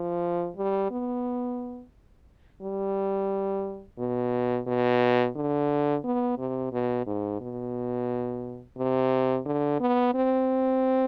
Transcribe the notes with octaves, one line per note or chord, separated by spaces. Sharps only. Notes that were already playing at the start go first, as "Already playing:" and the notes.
Already playing: F3
G3
B3
G3
B2
B2
D3
B3
C3
B2
G#2
B2
C3
D3
B3
C4